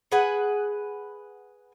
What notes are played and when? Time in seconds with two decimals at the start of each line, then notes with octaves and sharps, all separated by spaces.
0.12 G#4 B4 F#5 G#5